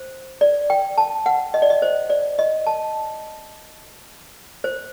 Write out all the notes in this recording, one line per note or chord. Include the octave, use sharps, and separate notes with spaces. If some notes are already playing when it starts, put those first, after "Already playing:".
Already playing: C5
D5
G5
A5
F#5
D#5
D5
D#5
C5
D5
D#5
A5
C5